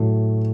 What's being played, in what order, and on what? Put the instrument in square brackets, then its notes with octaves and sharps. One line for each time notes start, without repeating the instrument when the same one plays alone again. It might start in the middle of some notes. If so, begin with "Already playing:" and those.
Already playing: [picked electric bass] A2 [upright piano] F#3 A3